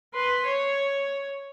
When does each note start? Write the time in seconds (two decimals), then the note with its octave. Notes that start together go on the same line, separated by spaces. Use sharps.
0.14 B4 C6
0.46 C#5